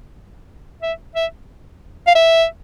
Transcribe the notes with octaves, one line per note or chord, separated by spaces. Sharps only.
E5
E5
F5
E5